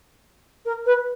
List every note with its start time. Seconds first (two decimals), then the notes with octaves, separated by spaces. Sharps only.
0.65 A#4
0.85 B4